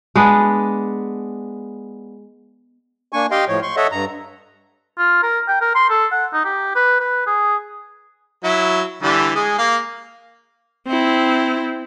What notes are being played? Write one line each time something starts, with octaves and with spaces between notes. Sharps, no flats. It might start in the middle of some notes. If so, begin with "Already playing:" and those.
G#3 B3 D4
A#3 D4 G#5 C#6
G4 D#5 F5 G5 C6
A2 F3 C#5
C6 C#6
A4 C#5 D#5 E5 F#5
G2 A#5
F4
A#4
G5
A#4
C6
A4
F#5
D#4
G4
B4
B4
G#4
F#3 E4
D3 E3 G3
G#3 G#4
A#3 F5
C4 E4